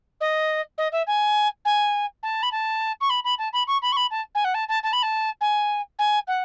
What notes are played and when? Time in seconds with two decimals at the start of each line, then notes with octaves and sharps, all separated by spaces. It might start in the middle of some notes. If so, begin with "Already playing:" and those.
0.20 D#5
0.78 D#5
0.92 E5
1.07 G#5
1.65 G#5
2.23 A5
2.42 B5
2.51 A5
3.01 C#6
3.10 B5
3.24 B5
3.38 A5
3.53 B5
3.67 C#6
3.82 B5
3.92 C#6
3.96 B5
4.11 A5
4.35 G#5
4.44 F#5
4.54 A5
4.68 A5
4.83 A5
4.93 B5
5.02 A5
5.41 G#5
5.99 G#5
6.27 F#5